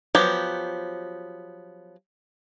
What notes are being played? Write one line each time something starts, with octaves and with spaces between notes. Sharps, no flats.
F3 F#3 B3 G4